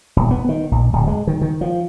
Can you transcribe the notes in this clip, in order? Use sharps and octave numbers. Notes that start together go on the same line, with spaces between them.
D#1
B3
D#3
A#1
D1
G#3
D#3
D#3
F3